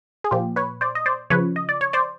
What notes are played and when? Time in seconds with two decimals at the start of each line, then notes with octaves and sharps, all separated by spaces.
0.24 G#4
0.31 A#2 F3 F4 G4
0.56 B4 C#5
0.81 C5 D5
0.95 D#5
1.06 C5 D5
1.30 C#3 F3 B4 C#5
1.56 D#5
1.69 D5
1.81 C#5
1.93 C5 D5